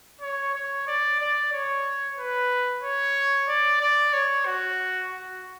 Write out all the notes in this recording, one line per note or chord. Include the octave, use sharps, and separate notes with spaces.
C#5
C#5
D5
D5
C#5
B4
C#5
D5
D5
C#5
F#4
F#4